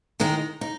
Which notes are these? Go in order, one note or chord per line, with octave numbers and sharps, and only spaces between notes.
D#3 G#3 D#4
D#4